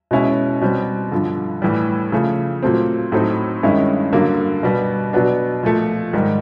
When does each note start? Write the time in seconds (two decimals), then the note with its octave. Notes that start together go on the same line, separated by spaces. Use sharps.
0.11 B2 G#3 C#4 E4
0.61 B2 G3 C4
1.12 G2 D3 F3
1.62 A2 E3 G3
2.12 C#3 F3 A3
2.62 A#2 F#3 A3 C4
3.12 A2 F#3 A3 C4 D#4
3.63 G2 D#3 G#3 C#4 E4
4.12 G2 D3 F#3 A#3
4.63 B2 G3 B3
5.13 B2 F#3 B3 D4
5.63 A#2 F3 A3
6.13 G#2 D#3 G3